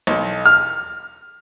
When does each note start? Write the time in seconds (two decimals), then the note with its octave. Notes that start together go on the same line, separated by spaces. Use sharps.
0.07 B1
0.46 F6